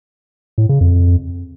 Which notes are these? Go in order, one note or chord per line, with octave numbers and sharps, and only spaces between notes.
A2
C#3
F2